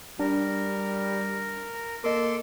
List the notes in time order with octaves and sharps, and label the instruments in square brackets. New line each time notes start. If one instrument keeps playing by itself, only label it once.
[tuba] G3 [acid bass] D4 [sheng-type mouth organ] A#4
[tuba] A#3 [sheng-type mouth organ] A4 C6 D6 [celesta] A#4 D#5